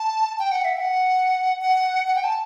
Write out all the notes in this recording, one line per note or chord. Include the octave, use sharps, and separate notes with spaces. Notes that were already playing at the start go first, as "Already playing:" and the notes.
Already playing: A5
G5
F#5
E5
G5
F#5
F#5
F#5
G5
A5